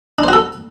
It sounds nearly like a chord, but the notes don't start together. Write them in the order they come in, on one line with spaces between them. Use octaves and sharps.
D4 C5 F#4 A4